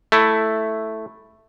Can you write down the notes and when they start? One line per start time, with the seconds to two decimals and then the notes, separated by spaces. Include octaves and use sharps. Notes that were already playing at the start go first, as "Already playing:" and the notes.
0.12 A3 E4